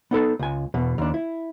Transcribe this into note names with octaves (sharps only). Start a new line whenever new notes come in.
B3 D#4 A4
C#2 G#5
E2 B2
D#2 D4
E4